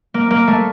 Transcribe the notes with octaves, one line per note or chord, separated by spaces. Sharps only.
A#3
A#3
A3